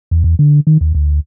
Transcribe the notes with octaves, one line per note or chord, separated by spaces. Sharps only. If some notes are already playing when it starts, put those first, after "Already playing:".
E2
E2
D3
D#3
D#2
D2